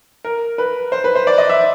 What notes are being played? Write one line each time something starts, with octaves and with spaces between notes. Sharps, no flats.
A#4
B4
C5
B4
C5
D5
D#5
E5